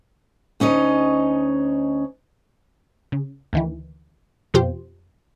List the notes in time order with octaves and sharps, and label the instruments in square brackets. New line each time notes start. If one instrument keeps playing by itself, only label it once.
[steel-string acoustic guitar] D2 C#4 D#4 D#5
[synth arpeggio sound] C#3
D2 D#3 E3
F2 B2 F4 G4 C5